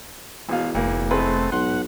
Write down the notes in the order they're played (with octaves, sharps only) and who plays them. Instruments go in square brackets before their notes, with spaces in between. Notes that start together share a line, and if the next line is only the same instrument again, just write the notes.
[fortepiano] G#1 B2 F5 [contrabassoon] E2
[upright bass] F1 [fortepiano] D2 A#3
[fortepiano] G#3 B3 B4 [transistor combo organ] A3 C4
[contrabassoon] B1 [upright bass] G#2 [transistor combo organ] F#5 [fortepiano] C6